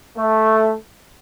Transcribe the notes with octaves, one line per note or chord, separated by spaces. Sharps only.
A3